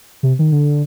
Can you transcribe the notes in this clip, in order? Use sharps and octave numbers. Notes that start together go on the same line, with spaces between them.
C3
D#3
D3